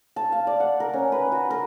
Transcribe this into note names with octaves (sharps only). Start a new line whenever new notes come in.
A5
F5
D5
F#5
A#4
C#4
B4
F#4
A#4